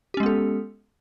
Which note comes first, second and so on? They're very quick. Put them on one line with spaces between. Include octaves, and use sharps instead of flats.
G4 C#4 G#3 B3 A4